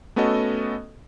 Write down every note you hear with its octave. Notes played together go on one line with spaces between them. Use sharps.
A3 B3 C#4 F#4 A4 D#5